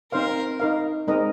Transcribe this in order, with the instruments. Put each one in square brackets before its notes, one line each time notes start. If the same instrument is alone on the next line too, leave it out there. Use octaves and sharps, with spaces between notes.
[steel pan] C4 D#4 C5 F5 [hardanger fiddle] A#4
[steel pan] D#4 A#4 F5
G#3 C4 D#4 A#4 D#5